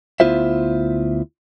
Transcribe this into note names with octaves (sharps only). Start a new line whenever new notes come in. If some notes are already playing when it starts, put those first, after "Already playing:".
D2 B3 E4 F4 C5 E5